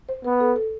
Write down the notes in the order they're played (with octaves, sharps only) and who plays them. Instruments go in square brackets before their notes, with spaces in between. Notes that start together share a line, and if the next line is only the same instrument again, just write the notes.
[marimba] C5
[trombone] B3 [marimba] B4
[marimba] A4
A4